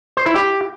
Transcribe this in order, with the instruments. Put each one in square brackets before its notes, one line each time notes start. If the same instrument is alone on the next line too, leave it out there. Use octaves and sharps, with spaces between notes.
[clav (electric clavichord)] C5
E4
G4